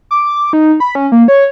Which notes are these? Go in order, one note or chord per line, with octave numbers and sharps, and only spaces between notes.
D6
D#4
B5
C#4
A#3
C#5